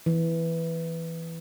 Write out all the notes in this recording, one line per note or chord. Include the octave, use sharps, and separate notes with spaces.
E3